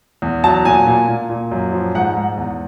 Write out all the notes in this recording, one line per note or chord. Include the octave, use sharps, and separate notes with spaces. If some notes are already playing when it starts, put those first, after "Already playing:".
E2
F#3 A5
A#2 G#5
A#2
A#2
A#2
F#2
F3
G#2 F#5
G#2
E2